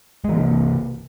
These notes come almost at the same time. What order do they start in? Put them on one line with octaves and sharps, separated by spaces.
G#3 E3 A#3 C3